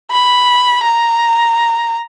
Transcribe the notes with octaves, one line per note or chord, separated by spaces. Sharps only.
B5
A#5